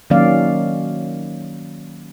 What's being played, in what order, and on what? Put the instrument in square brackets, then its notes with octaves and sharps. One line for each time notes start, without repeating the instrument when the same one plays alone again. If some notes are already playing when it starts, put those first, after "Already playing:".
[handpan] D#3 F#3 A#3 C#4 D5 F5